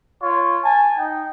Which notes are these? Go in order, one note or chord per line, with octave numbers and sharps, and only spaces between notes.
F4 C#5
G#5 A5
D#4 G5